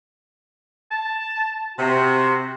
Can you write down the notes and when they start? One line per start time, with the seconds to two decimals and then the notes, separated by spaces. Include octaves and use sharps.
0.91 A5
1.78 C3 F#4